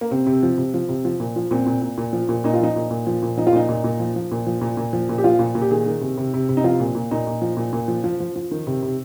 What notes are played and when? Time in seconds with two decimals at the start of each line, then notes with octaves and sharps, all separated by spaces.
0.01 A#3
0.11 C3 C4
0.27 C3
0.43 F3
0.58 C3
0.74 F3
0.89 C3
1.05 F3
1.20 A#2
1.36 F3
1.51 A#2 C4
1.67 A#2
1.82 A#2
1.98 A#2
2.13 F3
2.29 A#2
2.44 A#2 D#4
2.54 F4
2.60 F3 D#4
2.76 A#2
2.91 A#2
3.07 F3
3.23 A#2
3.37 F3 D#4
3.47 F4
3.53 A#2 D#4
3.69 A#2
3.84 A#2
4.00 F3
4.16 F3
4.32 A#2
4.47 F3
4.61 A#2
4.77 A#2
4.93 F3
5.09 A#2
5.18 G4
5.24 F3 F4
5.39 A#2
5.55 A#2
5.61 G4
5.71 D#3 G#4
5.86 D#3
6.01 C3
6.18 C3
6.34 C3
6.49 C3
6.57 D#4
6.64 F3 F4
6.80 A#2
6.95 A#2
7.11 A#2 D#4
7.27 A#2
7.42 F3
7.57 A#2
7.73 A#2
7.88 F3
8.04 F3
8.20 F3
8.36 F3
8.51 D#3
8.67 C3
8.82 C3